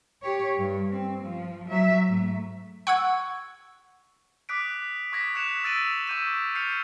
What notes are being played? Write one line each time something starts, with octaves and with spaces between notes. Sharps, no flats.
G4 C#5
G2
C4
F3
F#3 E5
G#2 A3
F#5 C#6 E6 G#6
D6 D#6 F#6 B6 D7
C#6 D#6 G#6 A#6 B6
C#6 F#6 C#7 E7 F7
E6 A6 D7 D#7 F#7
C#6 G6 D#7
F6 G6 C7 C#7 F7